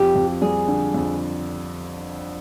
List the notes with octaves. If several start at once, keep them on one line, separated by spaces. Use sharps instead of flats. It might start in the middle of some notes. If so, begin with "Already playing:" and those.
Already playing: F2 G4
F2
G3 G#4
D3
F2